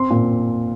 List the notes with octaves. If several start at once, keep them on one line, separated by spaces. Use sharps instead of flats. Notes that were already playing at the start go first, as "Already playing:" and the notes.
Already playing: C4 C6
A#2